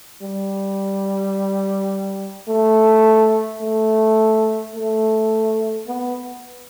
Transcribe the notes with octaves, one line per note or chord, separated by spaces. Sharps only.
G3
A3
A3
A3
B3